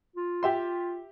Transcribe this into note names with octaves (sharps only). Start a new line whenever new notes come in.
F4
G4 E5 C6